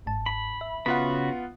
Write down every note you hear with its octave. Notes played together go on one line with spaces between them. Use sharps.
G1 G#2 A5
B5
E5
C#3 B3 F4 F#4 F#5 B5